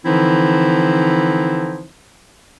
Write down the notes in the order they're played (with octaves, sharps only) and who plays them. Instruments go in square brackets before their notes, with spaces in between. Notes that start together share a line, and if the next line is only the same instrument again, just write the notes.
[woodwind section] D3 E3 F3 C4 D#4 E4